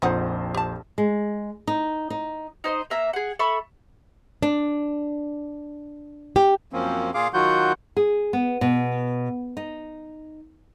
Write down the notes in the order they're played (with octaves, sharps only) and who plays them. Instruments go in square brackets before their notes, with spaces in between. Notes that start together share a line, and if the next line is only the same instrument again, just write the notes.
[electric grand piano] A#1 F2 C5 [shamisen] G#3 D#4 F#5
[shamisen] G4 A5
[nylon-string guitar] G#3
D#4
D#4
[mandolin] D#4 C5 D5 D#5
A#3 E5 A#5
G#4 F#5
A4 E5 B5 C#6
[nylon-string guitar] D4
G4
[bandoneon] F#2 F3 A#3 C4 C#4
A#2 F4 G#4 F5 D6
D#3 F#3 F4 F#4 F#5 G6
[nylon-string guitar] G#4
B3
B2
D#4